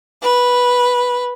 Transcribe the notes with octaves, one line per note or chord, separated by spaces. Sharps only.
B4